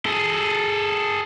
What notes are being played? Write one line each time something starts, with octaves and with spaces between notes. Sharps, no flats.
G#4 A4